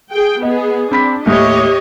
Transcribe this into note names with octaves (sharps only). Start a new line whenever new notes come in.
G#4 G5
B3 G#4 D#5
C4 D4 B5 B6
D#2 A2 G4 C#5 D#5